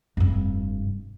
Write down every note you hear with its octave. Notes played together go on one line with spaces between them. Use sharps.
F1 G2